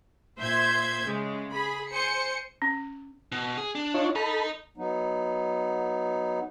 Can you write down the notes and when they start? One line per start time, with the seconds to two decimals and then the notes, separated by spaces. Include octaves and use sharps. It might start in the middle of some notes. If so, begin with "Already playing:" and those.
0.38 A#2 C5 E5 G6 G#6
1.06 C#3 G#3
1.52 G#4 B5
1.92 C5 G#5 C#7
2.62 C#4
3.32 B2
3.57 G#4
3.75 D4
3.94 D#4 F4 C#5
4.16 A4 D#5 A#5 B5
4.77 F#3 B3 D#4